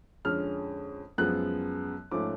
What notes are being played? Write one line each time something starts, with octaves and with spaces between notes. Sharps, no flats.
F2 D3 G#3 C#4 F6
F#2 F3 G#3 B3 F#6
G#2 F3 A3 C#4 D6